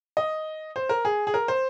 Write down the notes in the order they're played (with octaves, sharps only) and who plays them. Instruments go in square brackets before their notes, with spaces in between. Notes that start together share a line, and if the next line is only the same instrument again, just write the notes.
[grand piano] D#5
C5
A#4
G#4
G#4
A#4
C5